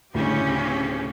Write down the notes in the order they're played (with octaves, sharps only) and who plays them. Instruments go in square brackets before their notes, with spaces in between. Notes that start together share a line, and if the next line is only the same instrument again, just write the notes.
[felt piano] D2 A2 [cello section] C#3 C#4 G4